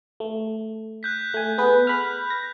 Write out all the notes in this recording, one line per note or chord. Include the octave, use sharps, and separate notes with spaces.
A3
F#6 G6 B6
A3 G#5
B3 G#4 B4
B5 F6 F#6
A#6